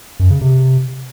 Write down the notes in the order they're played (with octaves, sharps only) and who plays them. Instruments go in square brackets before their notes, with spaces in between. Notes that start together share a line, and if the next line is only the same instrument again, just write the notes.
[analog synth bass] F#2
C#3
C3